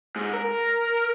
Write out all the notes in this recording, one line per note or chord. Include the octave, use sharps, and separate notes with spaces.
G#2
A#4